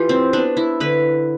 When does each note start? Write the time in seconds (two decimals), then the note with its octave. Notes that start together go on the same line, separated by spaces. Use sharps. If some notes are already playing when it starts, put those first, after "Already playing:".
Already playing: E3 F4 G4
0.09 C4
0.33 B3 D4
0.57 E4
0.80 D3 B4